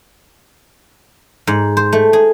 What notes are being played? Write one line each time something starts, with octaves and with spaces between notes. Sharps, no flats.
G#2
C5
A3
G#4